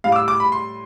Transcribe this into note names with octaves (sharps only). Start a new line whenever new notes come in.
A2 G3 F5
D6
E6
D6
B5
C6